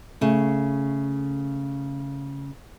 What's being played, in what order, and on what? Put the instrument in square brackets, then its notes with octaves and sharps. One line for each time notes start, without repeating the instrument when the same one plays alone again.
[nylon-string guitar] C#3 A3